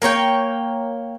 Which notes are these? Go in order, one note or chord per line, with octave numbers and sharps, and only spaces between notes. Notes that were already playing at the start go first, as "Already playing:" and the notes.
A#3 A#4 C#5 G5